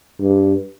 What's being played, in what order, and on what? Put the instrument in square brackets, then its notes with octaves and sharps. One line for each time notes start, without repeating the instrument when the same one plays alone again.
[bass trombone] G2